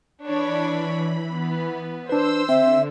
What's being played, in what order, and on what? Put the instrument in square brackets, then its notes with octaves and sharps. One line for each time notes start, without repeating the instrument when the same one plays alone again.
[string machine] E3 B5 [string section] D4 C#5
[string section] B3
[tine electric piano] D4 B4 [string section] C5 E6
[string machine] D3 [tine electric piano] C4 [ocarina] E5